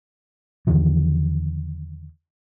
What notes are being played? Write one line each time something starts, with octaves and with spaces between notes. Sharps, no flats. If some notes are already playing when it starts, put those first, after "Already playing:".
E2 D3 D#3 F3